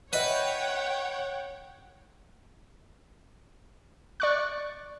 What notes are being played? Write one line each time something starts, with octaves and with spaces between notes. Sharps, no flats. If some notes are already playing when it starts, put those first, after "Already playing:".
E4 B4 C#5 D#5 E5 F#5 G5
D5 C#6 F#6